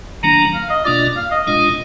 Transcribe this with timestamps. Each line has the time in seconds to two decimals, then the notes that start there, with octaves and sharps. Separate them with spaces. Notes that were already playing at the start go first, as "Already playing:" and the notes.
0.23 D#3 F#3 A#3 D4 A#5
0.54 F5
0.70 D#5
0.85 B2 A#3 D4 F4 D5
1.17 F5
1.31 D#5
1.47 A#2 G#3 D4 F4 D#5